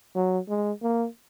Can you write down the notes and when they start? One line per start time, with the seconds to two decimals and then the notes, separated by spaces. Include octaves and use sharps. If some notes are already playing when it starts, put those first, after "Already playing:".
0.16 F#3
0.49 G#3
0.83 A#3